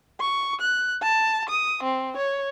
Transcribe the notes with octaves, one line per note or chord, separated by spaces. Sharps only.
C#6
F#6
A5
D#6
C4
C#5